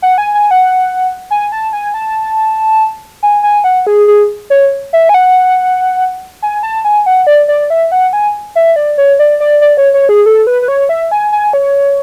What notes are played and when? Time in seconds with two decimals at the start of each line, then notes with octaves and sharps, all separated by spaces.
0.02 F#5
0.18 G#5
0.34 G#5
0.51 F#5
1.31 G#5
1.52 A5
1.73 G#5
1.94 A5
3.23 G#5
3.43 G#5
3.64 F#5
3.87 G#4
4.08 G#4
4.50 C#5
4.93 E5
5.09 G#5
5.14 F#5
6.42 G#5
6.63 A5
6.85 G#5
7.06 F#5
7.27 D5
7.48 D5
7.70 E5
7.92 F#5
8.13 G#5
8.55 E5
8.76 D5
8.98 C#5
9.19 D5
9.40 D5
9.61 D5
9.77 C#5
9.94 C#5
10.09 G#4
10.26 A4
10.47 B4
10.62 B4
10.68 C#5
10.89 E5
11.11 G#5
11.32 G#5
11.53 C#5